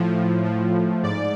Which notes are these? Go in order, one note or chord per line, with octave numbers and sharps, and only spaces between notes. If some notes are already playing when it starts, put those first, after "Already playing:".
Already playing: A2 F3
A2 F3
G#2 D5